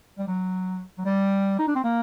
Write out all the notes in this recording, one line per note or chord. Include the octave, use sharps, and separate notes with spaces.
G3
F#3
F#3
G3
D#4
D4
C4
A#3